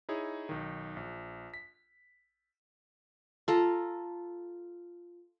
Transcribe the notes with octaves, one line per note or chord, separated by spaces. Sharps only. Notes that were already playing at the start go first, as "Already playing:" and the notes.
D#4 E4 G#4 C#5
B1 D#3
A#1
B6
F4 A4 A#5